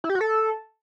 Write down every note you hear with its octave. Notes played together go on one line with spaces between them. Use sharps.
E4
G4
F#4
A4